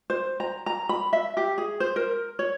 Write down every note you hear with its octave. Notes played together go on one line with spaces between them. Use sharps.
C5
A#5
A#5
B5
E5
G4
G#4
C5
A#4
C#5